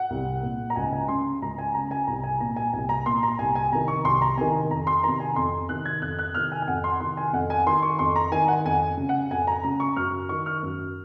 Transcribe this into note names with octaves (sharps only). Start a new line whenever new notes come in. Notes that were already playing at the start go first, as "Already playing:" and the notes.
Already playing: F#5
C2
A#2
A#5
C#2 G#5
G#5
C#3 C6
C#2 A#5
G#5
C#3 A#5
G#5
C2 A#5
G#5
A#2 A#5
G#5
C2 G#5
A#5
A#2 C6
A#5
C2 G#5
G#5
C3 D#3 A#5
C#6
C2 C6
A#5
C3 D#3 G#5
F2 A#5
C6
C3 D#3 A#5
G#5
F2 C6
C3 D#3 F#6
G#6
F2 F#6
F#6
C3 D#3 F6
G#5
G#5
F2 F#5
C6
C3 D#3 C6
G#5
F2 F#5
G#5
D#3 C6
C#6
F2 C6
A#5
D#3 G#5
F#5
F2 G#5
C#3
F#5
F2 G#5
A#5
C#3 A#5
C#6
F#2 F6
D#3 C#6
F6
F#2